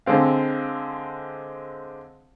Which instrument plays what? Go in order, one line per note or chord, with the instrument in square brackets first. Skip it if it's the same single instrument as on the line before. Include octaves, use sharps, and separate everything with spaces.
[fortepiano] D3 G#3 C4 F5